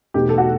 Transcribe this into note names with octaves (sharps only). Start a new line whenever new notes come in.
E2 B2 A3 D#4 G4
A4
F#4